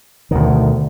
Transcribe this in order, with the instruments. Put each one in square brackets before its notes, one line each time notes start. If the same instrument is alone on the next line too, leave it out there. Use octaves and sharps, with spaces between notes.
[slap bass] D2 B2 D#3